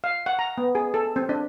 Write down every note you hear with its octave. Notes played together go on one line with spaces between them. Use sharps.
F5
F#5
A#5
B3
G#4
A4
C4
D4